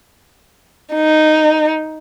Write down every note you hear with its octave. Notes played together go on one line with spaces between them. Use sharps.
D#4